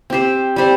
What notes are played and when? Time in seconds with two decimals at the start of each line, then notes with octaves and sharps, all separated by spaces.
0.10 C4 G4 C5
0.56 G3 C4 G4 C5